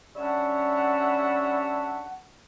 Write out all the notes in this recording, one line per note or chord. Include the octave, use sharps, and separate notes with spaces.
G3 C#4 D4 C#5 E5 F#5